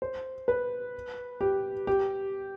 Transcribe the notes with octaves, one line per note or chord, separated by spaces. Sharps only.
C5
B4
G4
G4